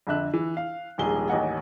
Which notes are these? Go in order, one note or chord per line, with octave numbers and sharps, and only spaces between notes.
F2 D3 E5 F#6
E3
F5
D#1 A#1 G#2 G#4 G7
A1 D#2 D#5 F#5 G#5